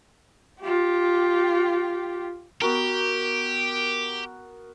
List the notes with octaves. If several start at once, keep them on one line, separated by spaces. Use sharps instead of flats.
F4 G4
B3 F#4 G4 A#4